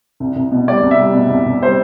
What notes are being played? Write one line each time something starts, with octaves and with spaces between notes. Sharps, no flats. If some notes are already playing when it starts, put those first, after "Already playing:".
C2
C2
B2
G3 D5
C2
E5
G3
B2
C2
C2
G3 C5